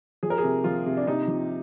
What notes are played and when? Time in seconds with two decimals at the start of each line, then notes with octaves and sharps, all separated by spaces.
0.23 F3 G#4
0.30 A#4
0.38 G#4
0.43 C3
0.64 F3 F4
0.86 C3
0.97 D4
1.07 C3 D#4
1.28 F3